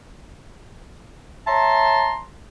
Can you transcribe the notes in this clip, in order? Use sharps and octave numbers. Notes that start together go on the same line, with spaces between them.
C#5 E5 A5 A#5 C6